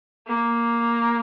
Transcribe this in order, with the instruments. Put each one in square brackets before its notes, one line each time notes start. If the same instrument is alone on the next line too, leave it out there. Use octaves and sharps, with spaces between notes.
[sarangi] A#3